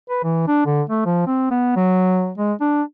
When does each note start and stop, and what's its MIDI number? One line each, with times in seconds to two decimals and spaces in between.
0.09 0.23 71
0.24 0.47 52
0.47 0.63 62
0.66 0.82 50
0.89 1.04 57
1.05 1.22 53
1.27 1.46 60
1.51 1.74 59
1.76 2.31 54
2.38 2.53 56
2.61 2.82 62